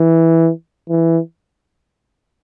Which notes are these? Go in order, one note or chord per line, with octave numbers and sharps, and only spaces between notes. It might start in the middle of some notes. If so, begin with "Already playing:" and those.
Already playing: E3
E3